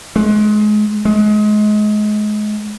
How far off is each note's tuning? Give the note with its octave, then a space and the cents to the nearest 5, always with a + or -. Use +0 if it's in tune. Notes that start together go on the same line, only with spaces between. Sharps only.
G#3 +30
G#3 +30